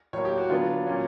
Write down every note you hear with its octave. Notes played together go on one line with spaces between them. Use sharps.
A2 F#3 A#3 C#5
G4
F#4
D3 F#3 B3 D4 F4
A#2 F#3 A#3 C#4